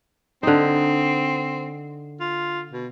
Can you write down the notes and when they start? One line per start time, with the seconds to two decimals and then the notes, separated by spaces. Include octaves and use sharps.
0.43 D3 C4 D#4
2.20 F4
2.71 B2